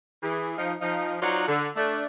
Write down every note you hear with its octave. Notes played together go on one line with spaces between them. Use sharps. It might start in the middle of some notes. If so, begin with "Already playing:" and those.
E3 G#4
F3 D#4
F3 D#4
F#3 D#4 F4 C5 D5 F#5
D3
A3 D4